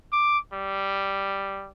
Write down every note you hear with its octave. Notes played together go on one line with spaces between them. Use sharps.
D6
G3